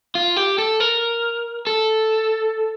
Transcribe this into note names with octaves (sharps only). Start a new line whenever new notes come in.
F4
G4
A4
A#4
A4